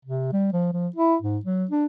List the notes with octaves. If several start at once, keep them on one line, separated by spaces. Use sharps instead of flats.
C3
G3
F3
F3
E4
G#2
F#3
D4